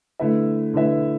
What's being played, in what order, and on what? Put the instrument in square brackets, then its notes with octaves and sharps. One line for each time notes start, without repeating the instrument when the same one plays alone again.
[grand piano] D3 A3 E4 B4 E5
D3 A3 E4 B4 E5